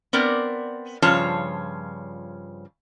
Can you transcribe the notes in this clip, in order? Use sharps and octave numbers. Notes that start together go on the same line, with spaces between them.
B3 C4 A#4 D5
G2 C#3 F3 F4 C#5 A5